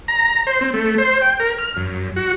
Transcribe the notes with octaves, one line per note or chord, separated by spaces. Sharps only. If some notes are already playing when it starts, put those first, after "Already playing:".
A#5
C5
C4
A3
C5
G5
A#4
F6
F#2
F#4